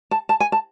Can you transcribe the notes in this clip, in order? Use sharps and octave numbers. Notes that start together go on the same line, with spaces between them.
A5
A5
G#5
A5